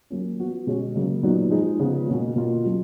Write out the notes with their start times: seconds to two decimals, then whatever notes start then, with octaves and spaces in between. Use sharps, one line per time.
0.10 F#3 A#3 C#4
0.39 F3 B3 F#4
0.67 B2 G#3 C#4 F#4
0.95 C#3 F#3 A#3
1.23 A#2 F#3 B3 D#4 F#4
1.51 F3 G#3 D#4
1.79 C#3 F3 G#3 B3
2.07 B2 A#3 C#4 F#4
2.36 B2 A#3 F4
2.64 F#3 C#4 F#4